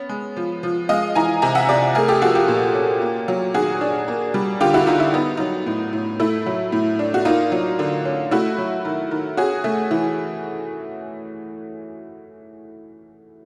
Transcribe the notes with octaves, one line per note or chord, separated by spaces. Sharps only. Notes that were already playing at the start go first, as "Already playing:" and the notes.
Already playing: B3 C#4
G#3
F3
F3
G#3 D#5 F5
E3 G#5 A#5
C3 G#5 A#5
E5 F#5
C3 D5 E5
A3 G#4 A#4
G4 A4
F3 F#4 G#4
F4 G4
A#2
C#4
A#3
F#3
D#3 F#4 G#4
D4
A#3
G3
D3 F4 G4
E4 F#4
D3 D#4 F4
E4
B3 D#4
F#3 D#4
A2
A2
A3 E4
F#3
A2
D4
F#4
A#3 D#4 F4
F#3
D3
C#4
A3 E4 F#4
F#3
D#3
D#3
C#4 F#4 G#4
A3
E3